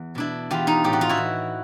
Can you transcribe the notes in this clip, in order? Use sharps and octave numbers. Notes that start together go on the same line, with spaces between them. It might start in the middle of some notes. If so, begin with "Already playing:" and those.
Already playing: E2
B2 D4 E4
E2 F4 G4
D#4 F4
A2 G4
F#4
F4
E4 F#4
E3